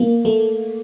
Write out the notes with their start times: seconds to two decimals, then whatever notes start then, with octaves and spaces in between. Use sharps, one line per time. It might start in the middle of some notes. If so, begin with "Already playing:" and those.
Already playing: A#3
0.25 A3